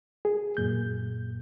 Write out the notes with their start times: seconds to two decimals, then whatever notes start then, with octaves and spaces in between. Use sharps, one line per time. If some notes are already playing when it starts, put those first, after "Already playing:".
0.25 G#4
0.57 F#2 A#2 G6